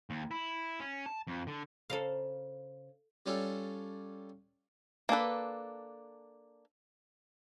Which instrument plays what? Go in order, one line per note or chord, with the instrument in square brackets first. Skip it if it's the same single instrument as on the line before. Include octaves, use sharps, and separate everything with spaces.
[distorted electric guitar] D#2
E4
C#4
A5
F2
D3
[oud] C#3 A#4 C5 [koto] A4 F5
[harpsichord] G3 C#4 D4 F4 A4
[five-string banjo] A#3 D4 A4 B4